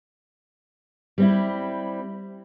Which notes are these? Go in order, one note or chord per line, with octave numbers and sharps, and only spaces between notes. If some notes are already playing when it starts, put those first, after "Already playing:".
G3 C4 E4